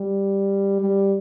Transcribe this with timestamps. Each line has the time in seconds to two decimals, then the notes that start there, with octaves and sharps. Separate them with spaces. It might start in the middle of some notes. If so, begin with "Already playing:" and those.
Already playing: G3
0.81 G3